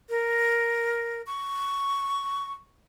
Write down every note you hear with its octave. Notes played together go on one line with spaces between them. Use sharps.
A#4
C#6